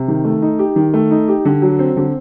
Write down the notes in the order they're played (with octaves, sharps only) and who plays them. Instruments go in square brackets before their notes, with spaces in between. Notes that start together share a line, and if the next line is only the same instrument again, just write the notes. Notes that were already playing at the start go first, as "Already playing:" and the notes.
Already playing: [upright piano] C3
D#3
A3
D#4
G4
D#3
A3
D#4
G4
D3
F#3
C4
D3